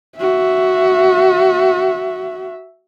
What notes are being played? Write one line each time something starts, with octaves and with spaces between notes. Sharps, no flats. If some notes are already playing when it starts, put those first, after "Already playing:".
F#4 E5